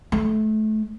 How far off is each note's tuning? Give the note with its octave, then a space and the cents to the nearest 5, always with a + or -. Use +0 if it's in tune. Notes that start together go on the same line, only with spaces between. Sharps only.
A3 -25